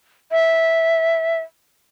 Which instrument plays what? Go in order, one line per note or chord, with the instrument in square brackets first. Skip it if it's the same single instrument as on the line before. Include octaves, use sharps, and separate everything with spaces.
[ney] E5